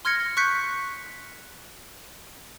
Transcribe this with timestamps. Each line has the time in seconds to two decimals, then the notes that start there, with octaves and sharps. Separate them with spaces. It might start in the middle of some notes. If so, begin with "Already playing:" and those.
0.05 C6 F6 G#6 A#6 C#7
0.37 C#6 F#6 G6 B6 C#7